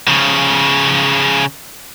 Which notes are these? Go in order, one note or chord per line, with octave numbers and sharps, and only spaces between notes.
C#3 F3